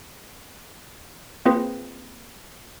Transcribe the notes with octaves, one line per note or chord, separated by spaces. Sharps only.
A#3 C4 F4 G#4 B4 C5